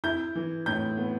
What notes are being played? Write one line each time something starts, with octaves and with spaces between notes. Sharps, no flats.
E4 G6
E3
A2 G6
B3